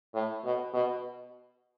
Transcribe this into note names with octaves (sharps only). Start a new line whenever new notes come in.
A2
B2
B2